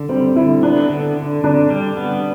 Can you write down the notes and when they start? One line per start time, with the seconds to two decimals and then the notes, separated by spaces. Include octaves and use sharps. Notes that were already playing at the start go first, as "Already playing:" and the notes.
Already playing: D3
0.09 G3 C4
0.36 D3 E4
0.63 B3 D4
0.90 D3
1.17 D3
1.44 D3 D4
1.70 G3
1.97 B3